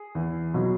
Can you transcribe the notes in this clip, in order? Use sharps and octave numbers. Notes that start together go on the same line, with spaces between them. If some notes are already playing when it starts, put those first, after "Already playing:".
Already playing: G#4
E2
B2 F#3